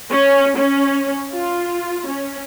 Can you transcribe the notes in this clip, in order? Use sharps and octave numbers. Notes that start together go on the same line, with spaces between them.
C#4
C#4
F4
C#4